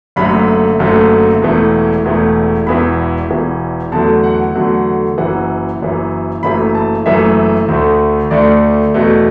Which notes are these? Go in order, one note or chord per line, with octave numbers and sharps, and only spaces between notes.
F#1 F#2 D3 A3 B5
F#1 F#2 D3 A3
E1 E2 E3 A3
E1 E2 E3 A3
E1 E2 E3 B5
E1 E2 E3
E2 D3 F#3 A3 A5
F#5
E2 D3 F#3 A3
F#1 F#2 E3 F#5
F#1 F#2 E3
F#1 F#2 E3 A3 B5
A5
F#1 F#2 E3 A3 E5
D2 D3 A3
D2 D3 A3 D5
E2 B2 A3